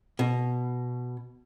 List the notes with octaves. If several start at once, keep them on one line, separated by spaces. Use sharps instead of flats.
B2